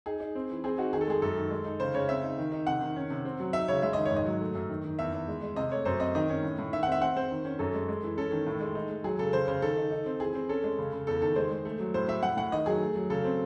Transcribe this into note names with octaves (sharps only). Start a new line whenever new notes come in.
D#4 G#4
D#4
C4
E3
C4 G#4
D#4 F#4
D#3 G#4
A4
G#3 G#4
F#2 A4
D#3
G#3
D#4
C#3 C5
C#3 C#5
C4 E5
D#4
D#3
D#4
C3 F#5
D#3
C#4
C3
C4
F#3
D#4 E5
C#3 C#5
G#3 E5
D#3 D#5
C#5
G#2
D#5
F#3
A3
F#2
D#3
D#3
E2 E5
E2
G#3
G#3
C3 D#5
A3 C#5
F#2 C5
C4 D#5
D#3 D#5
C#4
A2
A2
D#3 E5
F#5
C4 E5
C4 F#5
C4 C5
D#3
C#4
F#2 A4
G#3
G#3
E3
C#4 A4
D#3
A2
G#3
D#4
G#3
F#3 G#4
C#3 A4
C#3 C5
C#3 C5
D#3 A4
D#4
D#4
C4
E3 G#4
C4
C#4 A4
G#3
C#3
C#3
E2 A4
D#3 A4
G#3 C5
G#3
A3
F#3
A2 C5
A2 E5
A2 F#5
A2 F#5
D#3 D#5
F#3 G#4
A3
F#3
C#3 A4
C4